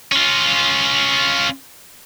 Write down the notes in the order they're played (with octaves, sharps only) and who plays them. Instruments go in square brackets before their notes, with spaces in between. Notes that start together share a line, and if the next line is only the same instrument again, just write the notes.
[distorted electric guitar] C#4 F4